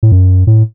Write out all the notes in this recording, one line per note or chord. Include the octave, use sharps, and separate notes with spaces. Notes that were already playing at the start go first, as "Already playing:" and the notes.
A2
F#2
A2